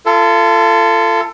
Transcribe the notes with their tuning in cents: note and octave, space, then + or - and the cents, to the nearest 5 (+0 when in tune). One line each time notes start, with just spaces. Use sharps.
F4 -35 A4 +15